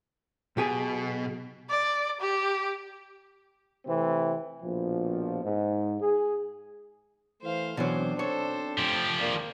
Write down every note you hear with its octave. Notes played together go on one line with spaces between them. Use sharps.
B1 B2 G4 G#4
D5
G4
C3 E3 A3 C4
A#1 B2 F3
G#2
G#4
E3 A3 C5 F5
B1 B2 E3 F#3 C4 D4 C5
A4 C5 C#5
F3 G4
G#1 A#3 D4